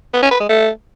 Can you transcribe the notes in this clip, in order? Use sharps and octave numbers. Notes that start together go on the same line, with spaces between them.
B3
C#4
B4
G#3
A3